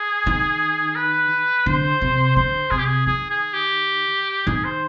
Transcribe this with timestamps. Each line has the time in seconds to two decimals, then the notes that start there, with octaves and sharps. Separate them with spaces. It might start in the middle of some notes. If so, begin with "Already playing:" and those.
Already playing: G#4
0.26 D#3
0.96 B4
1.66 D3 C5
2.01 C3
2.36 D3 C5
2.71 C3 G#4
2.79 G4
2.86 G#4
3.06 D#3 G#4
3.30 G#4
3.53 G4
4.46 D#3 G#4
4.64 C5